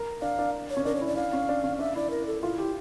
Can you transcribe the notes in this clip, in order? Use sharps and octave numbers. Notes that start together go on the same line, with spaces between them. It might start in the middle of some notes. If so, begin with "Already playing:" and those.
Already playing: A#4
D4 F5
D4
C#5
C#4
D4 A#4
C#5
E4
D5
D4 F5
C#4
D4
C#4
D4 E5
E4 D5
A#4
A4
E4 F4
G4